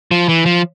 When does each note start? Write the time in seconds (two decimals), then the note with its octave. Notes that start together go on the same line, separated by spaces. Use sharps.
0.11 F3
0.29 E3
0.46 F3